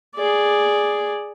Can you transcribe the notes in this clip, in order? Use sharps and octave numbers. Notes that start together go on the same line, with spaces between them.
G#4 D5